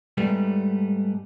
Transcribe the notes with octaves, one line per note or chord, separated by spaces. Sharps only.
G#2 G3 A3 B3